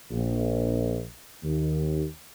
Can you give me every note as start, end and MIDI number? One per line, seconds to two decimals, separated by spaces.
0.11 1.02 34
1.44 2.05 39